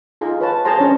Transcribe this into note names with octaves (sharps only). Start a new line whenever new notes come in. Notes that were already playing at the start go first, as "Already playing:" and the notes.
D#4 F4 G#4
B4 C#5 A5
G#4 C5 A5 A#5 C6
C#4 D4 G#4 C#5 A#5